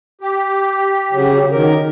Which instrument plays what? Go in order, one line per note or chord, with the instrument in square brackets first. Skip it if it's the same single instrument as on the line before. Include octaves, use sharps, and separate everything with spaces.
[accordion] G4
[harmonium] C#3 F#3
D#3 A#4